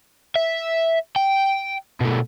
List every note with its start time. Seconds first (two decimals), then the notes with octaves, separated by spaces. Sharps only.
0.35 E5
1.16 G5
2.00 B2 A3